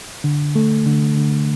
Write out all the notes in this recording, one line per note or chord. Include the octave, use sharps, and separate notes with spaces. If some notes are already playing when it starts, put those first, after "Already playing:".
D3
A3
D3
D3